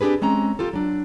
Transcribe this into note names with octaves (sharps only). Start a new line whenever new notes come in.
C4 D4 G4 G#4 B4
G#3 C4 C#4 A#5
F4 G4 A4
F#3 D4